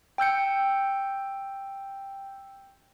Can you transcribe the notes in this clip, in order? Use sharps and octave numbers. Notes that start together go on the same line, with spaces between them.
G5 E6 G6 C#7